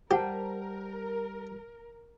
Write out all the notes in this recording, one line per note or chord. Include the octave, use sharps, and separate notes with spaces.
G3 G4 A#4 C5 F#5 G5 A5